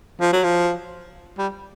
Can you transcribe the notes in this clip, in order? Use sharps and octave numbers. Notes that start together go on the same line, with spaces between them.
F3
F#3
F3
G3